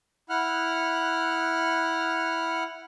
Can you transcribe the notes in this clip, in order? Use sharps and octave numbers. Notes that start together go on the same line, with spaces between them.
E4 F#5 F6 F#6